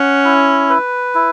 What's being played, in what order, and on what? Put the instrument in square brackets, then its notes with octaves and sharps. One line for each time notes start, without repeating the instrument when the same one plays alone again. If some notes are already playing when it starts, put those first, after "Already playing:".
Already playing: [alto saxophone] C#4 [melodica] F#5
[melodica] E4
B4
E4